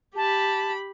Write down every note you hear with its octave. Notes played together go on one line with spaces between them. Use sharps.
G4 A5 B5